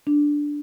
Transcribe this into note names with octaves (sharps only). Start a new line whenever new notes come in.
D4